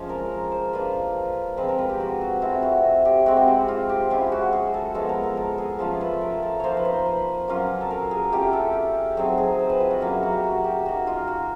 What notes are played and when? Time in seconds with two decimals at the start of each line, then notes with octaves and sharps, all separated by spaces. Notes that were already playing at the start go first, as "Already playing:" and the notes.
Already playing: F3 G#3 C#4 F4
0.09 A#4
0.52 C5
0.73 A#3 D4 F4 B4
1.57 F3 G#3 C4 B4
1.68 A#4
1.79 B4
1.89 G4
2.00 F#4
2.21 F#4
2.42 A3 C4 E4 F4
2.62 F#4
3.05 G4
3.26 G#3 C4 E4 F#4
3.37 G4
3.48 F#4
3.68 F4
3.89 G4
4.10 G#3 C#4 E4 F4
4.26 G4
4.32 F#4
4.53 G#4
4.74 A4
4.95 F3 G#3 B3 A4
5.09 A#4
5.23 A#4
5.37 A4
5.58 G#4
5.79 F3 A3 C#4 F4 A4
6.01 B4
6.21 A#4
6.42 A4
6.60 F3 A#3 D#4 C5 C#5
6.77 B4
6.85 C5
7.06 B4
7.48 F#3 A#3 C#4 F4
7.81 A4
7.91 A#4
8.11 G#4
8.32 A3 C#4 F4 G4
8.53 A4
9.17 F#3 A3 C4 D#4 G#4
9.38 G#4
9.59 C5
9.70 B4
9.80 F4
9.91 F#4
10.01 F#3 A#3 C#4 E4
10.23 F#4
10.33 G4
10.44 F#4
10.64 G4
10.85 A#3 D#4 F#4
11.07 F4
11.28 F#4